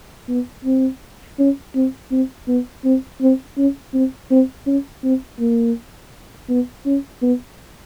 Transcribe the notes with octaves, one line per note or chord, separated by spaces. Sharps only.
B3
C4
C#4
C4
C4
B3
C4
C4
C#4
C4
C4
C#4
C4
A#3
B3
C#4
B3